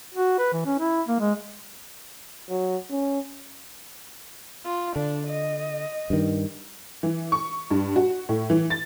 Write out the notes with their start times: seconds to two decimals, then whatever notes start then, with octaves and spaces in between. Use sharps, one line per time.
0.14 F#4
0.39 B4
0.53 E3
0.65 C#4
0.79 E4
1.07 A#3
1.20 G#3
2.50 F#3
2.91 C#4
4.66 F4
4.96 D3 D4
5.27 D#5
6.10 G2 D#3
7.03 E3
7.32 C#6
7.71 G2
7.96 F#4
8.29 A2
8.50 E3
8.70 A6